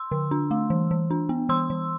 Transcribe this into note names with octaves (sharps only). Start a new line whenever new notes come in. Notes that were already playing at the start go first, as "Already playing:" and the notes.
Already playing: C6 E6
D3
D4
A3
E3
E3
D4
B3
E3 C6 E6
E3